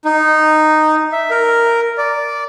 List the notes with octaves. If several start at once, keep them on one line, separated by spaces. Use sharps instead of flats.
D#4
E5
A#4
D5